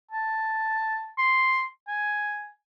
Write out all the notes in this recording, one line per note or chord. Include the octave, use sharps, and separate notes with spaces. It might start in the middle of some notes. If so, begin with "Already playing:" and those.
A5
C6
G#5